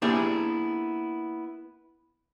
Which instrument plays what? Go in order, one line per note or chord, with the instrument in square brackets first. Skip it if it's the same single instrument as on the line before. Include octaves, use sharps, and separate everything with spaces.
[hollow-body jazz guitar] A#3 B3 D4 E4 G4 G#4